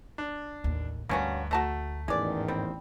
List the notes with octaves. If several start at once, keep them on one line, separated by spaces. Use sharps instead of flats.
D4
A1 D#2
D2 G2 A#3 C#4 F#4
A3 F#4 A5 A#5
A1 E2 G#2 D#3 G#3 D5
G3 C4